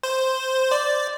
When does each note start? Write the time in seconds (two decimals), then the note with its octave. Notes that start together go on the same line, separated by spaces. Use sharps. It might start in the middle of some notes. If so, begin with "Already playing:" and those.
0.03 C5
0.72 D5